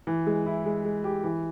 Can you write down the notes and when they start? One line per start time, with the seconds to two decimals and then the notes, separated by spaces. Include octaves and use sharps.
0.07 E3
0.27 G#3
0.46 E4
0.66 G#3
0.84 G#3
1.04 G4
1.24 E3